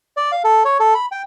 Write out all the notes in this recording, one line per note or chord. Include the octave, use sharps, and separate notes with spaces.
D5
F5
A4
C#5
A4
B5
G5